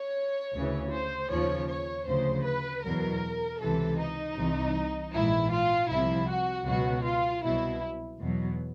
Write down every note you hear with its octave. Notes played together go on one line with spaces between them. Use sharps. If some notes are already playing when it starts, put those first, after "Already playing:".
Already playing: C#5
D2 C#3 E3
C5
D#2 C#3 F3 C#5
C#5
D2 C#3 F3 C5
B4
E2 B2 F#3 A#4
C#2 C3 E3 A4
D#4
C2 C3 E3
A#1 G#2 E3 E4
F4
C2 C3 F3 E4
F#4
C#2 B2 F#3 F#4
F4
C2 B2 F#3 E4
E2 B2 F#3